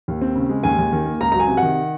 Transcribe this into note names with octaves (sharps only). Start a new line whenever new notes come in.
D#2
C4
C#3
G#3
D#2 G#5
D#2
D#3
A#3
C#2 A#5
F#3 A#5
G#5
C3
F#5
D#3